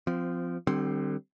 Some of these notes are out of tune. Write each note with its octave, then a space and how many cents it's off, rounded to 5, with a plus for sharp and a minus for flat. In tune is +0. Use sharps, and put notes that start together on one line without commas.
F3 +0 C4 -20
D3 +30 G3 -15 C4 +5